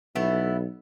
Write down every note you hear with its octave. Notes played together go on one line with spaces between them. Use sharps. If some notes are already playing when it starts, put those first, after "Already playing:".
B1 A3 B3 E4